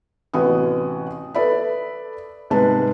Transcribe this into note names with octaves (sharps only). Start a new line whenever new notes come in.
A1 C3 B3 F#4 D#6
A4 B4 D5 E5 B5
C2 G#2 G#3 B4 A5